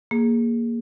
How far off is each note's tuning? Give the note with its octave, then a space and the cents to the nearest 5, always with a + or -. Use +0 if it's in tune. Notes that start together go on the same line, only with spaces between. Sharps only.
A#3 +0 G#4 +0